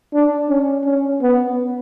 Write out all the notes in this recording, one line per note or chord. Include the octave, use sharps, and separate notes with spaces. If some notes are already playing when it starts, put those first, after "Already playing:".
D4
C#4
C#4
B3